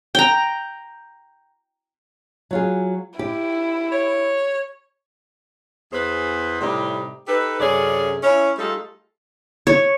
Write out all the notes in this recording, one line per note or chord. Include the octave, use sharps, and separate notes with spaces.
G5 A#5
F#3 F4 G#4
E4 G4
C#5
E2 G#4 B4 C5
A2 C3 G3 D#4 G4
D#4 G4 A4 B4
F#2 C3 C#4 G#4 A4 D5
C#4 E4
G3 A3 D#4 F4 G#4 A4
C#5